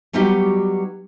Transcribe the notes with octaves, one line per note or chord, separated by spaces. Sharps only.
F#3 G3 B3 D#4 F#4 G4